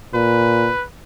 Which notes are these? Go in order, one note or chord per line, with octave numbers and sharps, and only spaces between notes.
A#2 B4